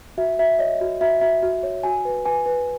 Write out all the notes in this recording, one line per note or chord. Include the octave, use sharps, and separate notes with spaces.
F#4 E5
F#4 E5
C#5 D#5
F#4
F#4 E5
F#4 E5
F#4
C#5
F#4 G#5
B4
B4 G#5
B4